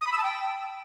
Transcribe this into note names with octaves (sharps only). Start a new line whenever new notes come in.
D#6
B5
E6
A5
G5